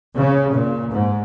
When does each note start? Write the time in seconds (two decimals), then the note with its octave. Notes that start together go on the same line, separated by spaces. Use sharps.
0.17 C#3
0.53 A#2
0.93 G#2